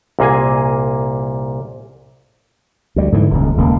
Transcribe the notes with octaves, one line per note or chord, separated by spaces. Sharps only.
C2 A#2 A#3 G#4 G#5
D2 G3
G#2 D3 E3
D#1 C#2
D#1 C#2 D#3 A#3